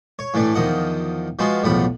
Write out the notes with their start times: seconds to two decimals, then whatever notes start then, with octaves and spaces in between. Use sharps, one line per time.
0.19 C#5
0.34 A2 E3 A3 D4
0.55 E2 D#3 F3 D#5 F#5
1.39 F3 G#3 B3 F4 F#4
1.63 B1 E2 A2 F3 F#5 B5